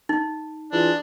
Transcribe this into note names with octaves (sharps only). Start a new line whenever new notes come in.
D#4
E3 D4 F4 G#4